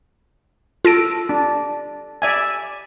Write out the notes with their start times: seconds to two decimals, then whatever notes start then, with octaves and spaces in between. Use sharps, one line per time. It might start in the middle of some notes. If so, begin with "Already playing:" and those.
0.85 F4 A4 A#6 D7
1.29 D4
2.22 D5 E5 G#5